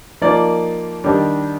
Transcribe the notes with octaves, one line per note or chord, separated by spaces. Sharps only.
F3 A#3 D#4 A#4 D5
D#3 G3 D4